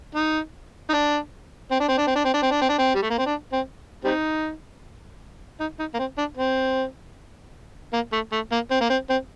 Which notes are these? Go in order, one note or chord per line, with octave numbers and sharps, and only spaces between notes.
D#4
D#4
D4
C4
D4
C4
D4
C4
D4
C4
D4
C4
D4
C4
D4
C4
G3
A3
A#3
C4
D4
C4
G3 C4 D#4
D#4
D#4
A#3
C4
D4
C4
A#3
A3
A3
A#3
C4
A#3
C4
C4